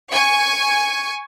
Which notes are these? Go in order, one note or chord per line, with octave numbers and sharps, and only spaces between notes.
G#5 C#6